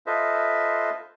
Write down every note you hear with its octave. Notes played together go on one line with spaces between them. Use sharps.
F4 A4 B4 C5 D#5 E5